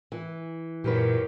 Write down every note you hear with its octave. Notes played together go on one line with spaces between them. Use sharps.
E3
F#2 A#2 F#3 G4 A#4 B4